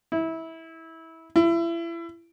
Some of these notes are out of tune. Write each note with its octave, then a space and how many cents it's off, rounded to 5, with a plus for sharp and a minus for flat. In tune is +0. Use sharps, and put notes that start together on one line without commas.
E4 -20
E4 +30